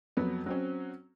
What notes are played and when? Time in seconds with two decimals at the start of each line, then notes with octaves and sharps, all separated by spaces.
0.17 F2 F#3 B3
0.46 F#3 C4 C#4